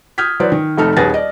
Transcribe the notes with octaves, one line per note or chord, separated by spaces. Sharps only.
D#6 F6 G6 G#6 B6
E3 F#3 B4 C5 D5
D#3
F1 A3 D#4 A4 F6
D#1 D#2 G#4 B4 A6 A#6
D5 D#5